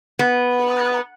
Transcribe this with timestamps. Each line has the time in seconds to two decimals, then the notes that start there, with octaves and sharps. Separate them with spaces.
0.19 B3